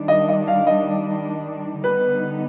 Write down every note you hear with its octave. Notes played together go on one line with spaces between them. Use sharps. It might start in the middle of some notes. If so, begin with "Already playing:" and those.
Already playing: D#3 G3 D4
D#5
D#5
F5
D#5
D3 G3 B3 D#4 B4